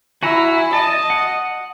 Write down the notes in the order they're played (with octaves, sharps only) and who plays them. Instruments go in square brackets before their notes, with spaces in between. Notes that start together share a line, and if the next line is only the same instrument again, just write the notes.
[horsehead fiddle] E4 [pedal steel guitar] F#4 G#5 A#5
[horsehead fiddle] D#5 [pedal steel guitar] A5
[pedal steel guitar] F#5